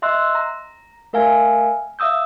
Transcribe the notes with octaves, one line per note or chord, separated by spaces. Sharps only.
D#5 E5 C6 E6 F#6
A#5
A3 A#4 E5 F5 G#5
E5 F5 D#6 E6 G6